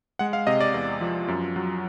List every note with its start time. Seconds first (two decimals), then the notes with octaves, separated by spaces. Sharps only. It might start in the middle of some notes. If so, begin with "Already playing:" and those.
0.19 G#3 F#5
0.33 F5
0.47 C3 D#5
0.61 D5
0.74 E2
1.01 F3
1.28 F#2
1.56 F#3